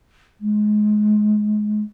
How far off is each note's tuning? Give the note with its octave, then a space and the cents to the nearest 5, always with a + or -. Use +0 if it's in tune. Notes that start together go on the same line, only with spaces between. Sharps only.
G#3 +25